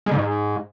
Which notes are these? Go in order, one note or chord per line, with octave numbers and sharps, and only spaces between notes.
G#3
D3
G#2